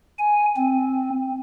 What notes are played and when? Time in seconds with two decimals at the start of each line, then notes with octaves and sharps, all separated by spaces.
0.18 G#5
0.57 C4